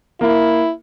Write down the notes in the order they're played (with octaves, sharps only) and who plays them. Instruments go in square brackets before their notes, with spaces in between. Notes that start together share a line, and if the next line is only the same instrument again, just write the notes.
[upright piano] A#3 [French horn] E4